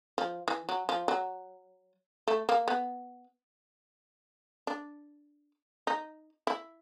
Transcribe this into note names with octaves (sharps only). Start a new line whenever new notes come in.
F3
E3
F#3
F3
F#3
A3
A#3
B3
D4
D#4
E4